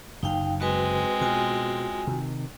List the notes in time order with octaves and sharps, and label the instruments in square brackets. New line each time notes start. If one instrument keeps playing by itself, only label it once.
[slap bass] F#1 F#2 D3 [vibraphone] D#4 F5 G5
[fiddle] G#3 C4 [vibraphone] F#4 B4
[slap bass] B2 [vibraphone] F4 F#4 G#5
[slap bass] C3 D#3